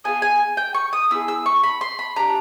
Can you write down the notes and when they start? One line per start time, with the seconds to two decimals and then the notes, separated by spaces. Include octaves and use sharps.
0.04 B3 D4 F4 G#4 G#5
0.22 G#5
0.57 G5
0.74 C#6
0.93 D#6
1.10 B3 E4 G#4 E6
1.28 E6
1.46 C#6
1.63 B5
1.81 C6
1.99 B5
2.16 D4 G4 A#5